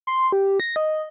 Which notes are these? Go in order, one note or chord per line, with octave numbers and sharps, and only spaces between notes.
C6
G4
A#6
D#5